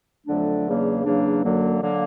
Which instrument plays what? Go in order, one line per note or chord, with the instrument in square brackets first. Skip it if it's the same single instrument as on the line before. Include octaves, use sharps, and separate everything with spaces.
[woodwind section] F2 D3 F#3 A3 D4
E2 C#3 F#3 A#3 D4
E2 C#3 F#3 A#3 D4
F#2 D3 F#3 A#3
D3 F#3 A#3